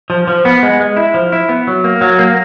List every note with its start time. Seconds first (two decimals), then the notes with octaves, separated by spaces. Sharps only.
0.10 F3
0.28 F3
0.45 B3
0.63 G#3
0.80 G#3
0.97 E4
1.14 F3
1.32 E4
1.49 B3
1.67 F#3
1.84 A#3
2.01 F#3
2.19 A#3